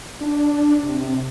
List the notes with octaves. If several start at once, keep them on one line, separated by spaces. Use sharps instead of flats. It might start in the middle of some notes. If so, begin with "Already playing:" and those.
D4
C3